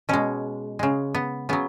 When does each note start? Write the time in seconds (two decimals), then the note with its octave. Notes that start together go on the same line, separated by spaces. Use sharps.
0.09 B2 G#3 C#4
0.79 C#3 G#3
1.15 B3
1.49 C#3 F#3 B3